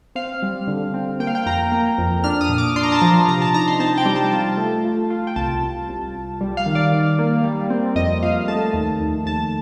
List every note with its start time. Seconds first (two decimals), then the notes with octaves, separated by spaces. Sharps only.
0.15 C4 F5
0.43 G3
0.67 D3
0.94 C4
1.20 A#3 G5
1.27 F5
1.35 G5
1.46 F2 A#5
1.72 A#3
1.98 F2
2.24 D4 F6
2.41 D#6
2.49 A#2
2.58 D6
2.76 D4 C6
2.83 A#5
2.92 A5
2.99 F3 A#5
3.28 C3 A#5
3.42 A5
3.54 D#4 A#5
3.68 C6
3.80 C4 A5
3.98 G5
4.06 G3
4.15 A5
4.32 F4 A5
4.58 A3
4.85 F4
5.10 F4
5.27 G5
5.36 C2 A5
5.62 C2
5.89 C2
6.15 C2
6.41 G3
6.57 F5
6.66 D#3
6.75 D5
6.92 D#3
7.19 A#3
7.44 G3
7.70 C4
7.96 F2 D#5
8.23 F2 F5
8.48 A3 A5
8.74 D#2
9.00 D#2
9.26 D#2 A5